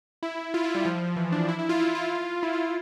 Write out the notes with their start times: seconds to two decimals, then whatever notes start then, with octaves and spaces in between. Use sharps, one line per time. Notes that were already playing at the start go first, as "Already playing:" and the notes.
0.23 E4
0.54 F4
0.64 E4
0.75 G3
0.85 F3
1.16 E3
1.32 D4
1.48 E4
1.59 E4
1.69 F4
1.80 E4
1.95 F4
2.43 E4
2.53 F4
2.64 E4